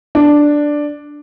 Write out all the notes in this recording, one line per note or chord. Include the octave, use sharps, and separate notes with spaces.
D4